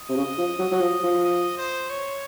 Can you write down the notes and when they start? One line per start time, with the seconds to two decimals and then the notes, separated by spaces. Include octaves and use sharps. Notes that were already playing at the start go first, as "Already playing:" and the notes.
Already playing: D#5
0.09 C3
0.16 C#3
0.38 F3
0.59 F#3
0.72 F#3
0.80 F3
1.03 F3
1.25 D#5
1.58 C5
1.90 C#5